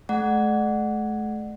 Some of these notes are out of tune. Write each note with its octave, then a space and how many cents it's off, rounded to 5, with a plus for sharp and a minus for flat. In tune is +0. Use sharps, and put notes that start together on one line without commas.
A3 -40 D5 +35 F#5 +0